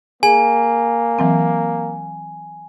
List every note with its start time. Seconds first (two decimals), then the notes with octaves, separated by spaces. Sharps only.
0.23 A#3 G#4 G#5
1.19 E3 F#3 C4